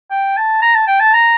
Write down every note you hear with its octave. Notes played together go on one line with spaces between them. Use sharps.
G5
A5
A#5
A5
G5
A5
A#5